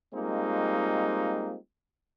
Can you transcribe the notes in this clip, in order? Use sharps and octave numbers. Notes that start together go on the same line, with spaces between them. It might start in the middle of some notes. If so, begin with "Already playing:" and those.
G3 G#3 A#3 C4 D#4 F4